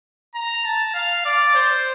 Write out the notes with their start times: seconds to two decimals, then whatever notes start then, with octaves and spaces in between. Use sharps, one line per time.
0.35 A#5
0.65 A5
0.94 F5
1.25 D5
1.55 C5